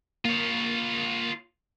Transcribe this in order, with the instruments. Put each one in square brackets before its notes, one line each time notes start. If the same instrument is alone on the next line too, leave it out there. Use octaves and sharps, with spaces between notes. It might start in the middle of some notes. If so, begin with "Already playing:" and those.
[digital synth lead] A#3 [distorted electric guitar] F4 C#5